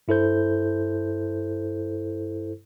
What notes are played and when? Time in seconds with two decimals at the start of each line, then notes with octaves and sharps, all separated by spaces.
0.08 G2 E4 A4 C5 G6